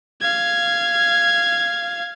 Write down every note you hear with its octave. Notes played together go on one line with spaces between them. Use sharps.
F5 G#6